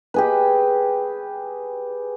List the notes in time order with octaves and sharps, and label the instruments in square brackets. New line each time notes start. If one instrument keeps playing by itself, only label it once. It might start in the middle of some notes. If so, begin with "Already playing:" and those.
[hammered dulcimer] G4 G#4 B4